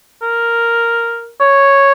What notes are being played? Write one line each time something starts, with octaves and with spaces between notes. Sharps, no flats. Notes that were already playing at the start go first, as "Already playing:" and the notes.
A#4
C#5